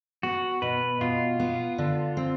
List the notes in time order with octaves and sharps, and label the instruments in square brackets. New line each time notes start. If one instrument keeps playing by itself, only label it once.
[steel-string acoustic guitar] B3 [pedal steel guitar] F#4
[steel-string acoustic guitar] B2 [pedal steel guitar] B4
[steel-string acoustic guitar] B2 [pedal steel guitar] F4
[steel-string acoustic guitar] B3
D3
C4